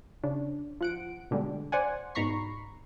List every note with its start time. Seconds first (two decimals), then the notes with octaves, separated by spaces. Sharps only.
0.24 C#3 D4
0.81 F3 F#5 D7
1.31 B2 D3 G3 G#3
1.72 C5 D5 F#5 G#5
2.15 G#2 B2 A#5 B5 C#6 C7